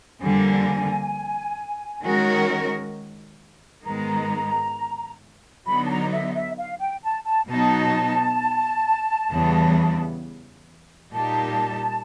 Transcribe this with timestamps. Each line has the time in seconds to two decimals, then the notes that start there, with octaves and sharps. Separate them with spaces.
0.21 F2 D3 G3 A#3 G#5
2.03 D#3 G#3 C#4 F#4 A#4
3.84 G#2 D#3 G#3 B3 A#5
5.67 D3 F#3 B3 D#4 B5
5.85 A5
5.89 A#5
6.12 E5
6.35 E5
6.58 F5
6.80 G5
7.03 A5
7.26 A5
7.48 B2 F#3 B3 D#4 A5
9.30 E2 C#3 E3 G3 B3
11.12 A#2 G3 A#3 D#4 G4 A5